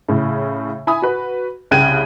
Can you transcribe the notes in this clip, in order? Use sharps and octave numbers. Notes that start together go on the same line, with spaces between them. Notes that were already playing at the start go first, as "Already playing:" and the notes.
A2 C#3
E4 G#5 B5 D#6
F#4 B4
C2 C#3 G5 F#6 G#6 D#7